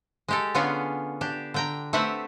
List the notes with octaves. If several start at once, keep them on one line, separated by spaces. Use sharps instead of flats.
G#3 G4 A4
D3 B3 C#4 F4 G#4 C#5
D4 G4
D3 G5 A#5
A3 C4 G4 B4 E5 F#5